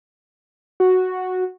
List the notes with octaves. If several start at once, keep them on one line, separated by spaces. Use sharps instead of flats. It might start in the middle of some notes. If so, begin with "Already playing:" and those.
F#4